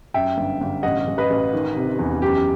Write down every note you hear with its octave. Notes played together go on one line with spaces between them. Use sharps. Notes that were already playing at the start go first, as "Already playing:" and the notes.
F#2 E5 G5
G1
G1
A1 D#5 F#5
A1
B4 D#5
A1
D#3
C3
E2
F#2 G4